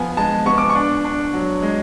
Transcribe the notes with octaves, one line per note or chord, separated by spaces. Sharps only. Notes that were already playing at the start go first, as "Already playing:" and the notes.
Already playing: F3 B3 G#5
G#3 A5
B3 C#6
D6
C#6
D4
D4
F#3
G#3